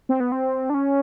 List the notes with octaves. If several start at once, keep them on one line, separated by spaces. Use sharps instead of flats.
C4
B3
C4
D4
C#4